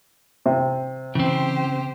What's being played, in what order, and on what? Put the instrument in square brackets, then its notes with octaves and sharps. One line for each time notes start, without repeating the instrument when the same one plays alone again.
[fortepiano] C3 [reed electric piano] C5
[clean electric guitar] C#3 C4 [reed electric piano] E3 [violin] G4 C5